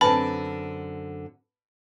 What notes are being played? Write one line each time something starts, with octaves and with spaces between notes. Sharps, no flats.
F#2 D3 C4 B4 G#5 A5 B5